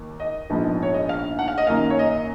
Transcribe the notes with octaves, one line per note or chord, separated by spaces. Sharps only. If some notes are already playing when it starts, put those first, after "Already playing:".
Already playing: D#2
D#5
A#1 G#2 F3 B3
C#5
D#5
F5
F#5
F5
D#5
F#2 D#3 F#3 A#3 F5
C#5
D#5